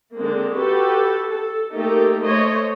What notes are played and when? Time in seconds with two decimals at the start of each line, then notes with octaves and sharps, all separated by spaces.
0.17 D3 G#3 A#3 C4
0.55 F#4 G4 A4 B4
1.30 A4
1.74 A3 A#3 D#4 G4 A4 A#4
2.22 A3 C5 C#5 D#5